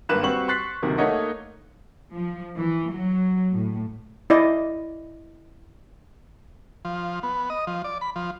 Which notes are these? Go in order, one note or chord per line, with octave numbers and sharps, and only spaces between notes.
G#1 G2 A#3 B4 F#6 E7
G3 C4 F#4 B4 C#6 F#7
C6 C#6 F#6 A6 B6 C7
F#1 D2 C3 D#3
A3 A#3 D#4 C#5 D#5 F#5
F3
E3
F#3
A2
E4 D5 D#5
F3
B3
D#5
F3
D5
B5
F3